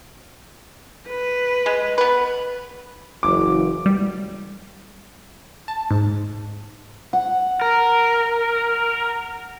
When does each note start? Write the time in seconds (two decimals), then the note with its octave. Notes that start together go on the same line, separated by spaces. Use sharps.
1.08 B4
1.66 G#3
1.98 B3 B4
3.23 F#1 E3 D6
3.86 G3
5.68 A5
5.91 G#2
7.13 F#5
7.61 A#4